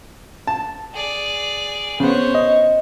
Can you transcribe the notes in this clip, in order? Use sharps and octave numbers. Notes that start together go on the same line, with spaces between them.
A5
G#4 D5
C#3 B3 C5 C#5
D#5